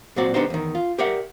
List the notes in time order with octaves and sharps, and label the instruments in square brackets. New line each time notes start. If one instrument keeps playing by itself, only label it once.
[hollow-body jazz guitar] A#2 F#3 C4 F#4 D5
D3 B3 D4 D#4 G4 C5
E2 D#3
F4
G4 A#4 D5 E5 F#5